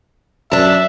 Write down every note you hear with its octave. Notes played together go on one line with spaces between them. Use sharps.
F#2 D4 E5 A5